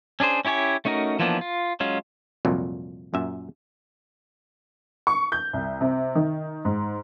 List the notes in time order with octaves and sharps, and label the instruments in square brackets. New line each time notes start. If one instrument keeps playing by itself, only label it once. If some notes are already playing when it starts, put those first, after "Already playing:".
[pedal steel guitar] C#4 D4 G#4 C5
C#4 E4 G4 C#5 G#5
A3 C#4 D#4 F#4 A#4
E3 F3 A#3 B3 D4
F4
F#3 G#3 C#4 F4
[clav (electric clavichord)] C2 F2 A#2 F#3
F#2 A#2 E5
[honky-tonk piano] C#6
G6
C2
C3
D#3
G#2